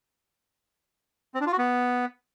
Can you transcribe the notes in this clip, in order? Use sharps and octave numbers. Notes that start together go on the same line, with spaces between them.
C4
D4
F4
F#4
B3